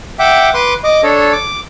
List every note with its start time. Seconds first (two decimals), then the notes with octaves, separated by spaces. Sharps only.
0.19 E5 F#5 G5 D6
0.54 B4 C6 D6
0.84 D#5 D6
1.03 D4 A4 C#5
1.32 D6